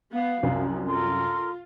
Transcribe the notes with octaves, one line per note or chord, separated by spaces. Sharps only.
B3 F5
C2 F#2 F3
F4 A4 A#4 C6